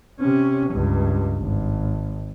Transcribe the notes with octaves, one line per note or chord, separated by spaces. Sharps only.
C3 C#4
C#2 G2
G#1